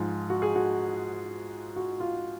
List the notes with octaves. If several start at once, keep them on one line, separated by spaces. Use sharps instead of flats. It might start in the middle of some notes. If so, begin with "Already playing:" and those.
Already playing: G#2 F3 G#3 F4
F#4
G#4
F#4
F#4
F4